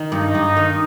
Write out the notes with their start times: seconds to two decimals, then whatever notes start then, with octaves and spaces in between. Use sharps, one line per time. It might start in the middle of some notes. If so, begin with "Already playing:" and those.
Already playing: D#3
0.12 G2 D#4
0.35 G2
0.57 D#3